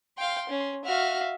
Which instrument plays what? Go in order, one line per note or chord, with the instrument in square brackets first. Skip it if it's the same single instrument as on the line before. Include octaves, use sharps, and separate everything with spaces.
[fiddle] F5 G5 [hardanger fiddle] C6
[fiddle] C#4
[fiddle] F#4 F6 [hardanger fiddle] E5 F5